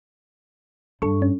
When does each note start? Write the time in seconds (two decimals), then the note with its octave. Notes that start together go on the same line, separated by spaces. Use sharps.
1.02 G2 A4 C#6
1.22 C#4